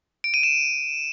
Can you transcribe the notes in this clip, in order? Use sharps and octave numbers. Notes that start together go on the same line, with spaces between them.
D7
D#7
E7